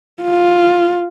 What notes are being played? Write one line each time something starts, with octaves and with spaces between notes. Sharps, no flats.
F4